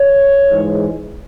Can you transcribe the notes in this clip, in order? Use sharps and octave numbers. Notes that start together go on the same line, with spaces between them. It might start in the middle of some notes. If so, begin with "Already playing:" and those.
Already playing: C#5
G#2 E3 G#3